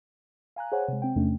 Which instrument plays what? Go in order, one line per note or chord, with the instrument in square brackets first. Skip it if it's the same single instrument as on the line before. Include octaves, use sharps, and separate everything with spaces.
[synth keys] F5 G#5 A#5 F#6
G#4 C5 C#5 F#5 G#5
C3 G#3
C4 G5
E2 C3 A3 C#4 D4